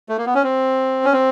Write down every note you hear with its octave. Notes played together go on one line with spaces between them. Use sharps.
A3
A#3
B3
C#4
C4
C#4
C4